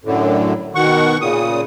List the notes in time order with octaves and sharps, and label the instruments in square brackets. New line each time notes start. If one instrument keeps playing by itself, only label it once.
[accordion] F#2 A2 D3
B2 D#3 F#5 C#6
A#2 C#3 D#6